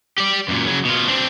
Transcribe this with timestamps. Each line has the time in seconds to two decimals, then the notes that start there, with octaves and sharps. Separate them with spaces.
0.18 G4 D5
0.48 F#2 A#2
0.67 C#3 F#3
0.85 B2 F4
1.08 C4 D4